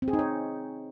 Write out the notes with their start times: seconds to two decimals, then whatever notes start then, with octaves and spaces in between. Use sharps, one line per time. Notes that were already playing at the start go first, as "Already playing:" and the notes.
0.02 C4
0.08 G#4
0.13 D#4
0.19 C#5